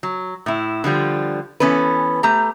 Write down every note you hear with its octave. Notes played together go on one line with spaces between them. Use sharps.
F#3
A2 E4
D3 F3 G3 F4
E3 B3 C#4 A4 B4
A3 G4 A#5